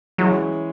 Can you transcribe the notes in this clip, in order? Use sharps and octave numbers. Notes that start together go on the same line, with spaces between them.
E3 F#3 G#3 C#4